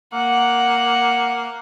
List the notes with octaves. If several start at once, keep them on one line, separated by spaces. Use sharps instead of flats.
A#3 F#5